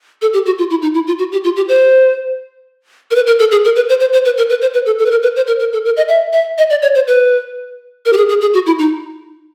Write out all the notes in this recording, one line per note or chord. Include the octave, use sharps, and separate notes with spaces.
A4
G4
F#4
F4
E4
D#4
E4
F4
F#4
G4
F4
G4
C5
A#4
B4
A#4
A4
G#4
A#4
B4
C5
C5
C5
B4
A#4
B4
C5
B4
A4
A4
B4
A#4
B4
C5
A#4
A#4
A4
A#4
D#5
E5
E5
D#5
D5
C#5
C5
B4
A#4
G4
G#4
G#4
G#4
F#4
E4
D#4